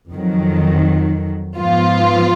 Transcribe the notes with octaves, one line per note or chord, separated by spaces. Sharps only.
F2 D#3 F#3
G#2 F3 B3 F4